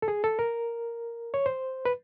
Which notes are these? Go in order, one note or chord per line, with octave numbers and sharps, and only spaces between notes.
A4
G#4
A4
A#4
C#5
C5
B4